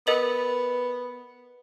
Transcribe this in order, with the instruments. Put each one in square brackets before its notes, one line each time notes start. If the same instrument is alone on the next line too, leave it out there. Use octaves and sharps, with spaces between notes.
[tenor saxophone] B3 [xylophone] A#4 D#5 F#7